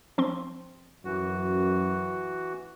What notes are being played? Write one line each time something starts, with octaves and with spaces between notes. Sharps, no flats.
F3 C4 C6
F#2 E3 F#4